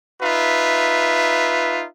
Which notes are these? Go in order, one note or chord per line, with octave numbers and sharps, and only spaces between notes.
D#4 F4 B4 E5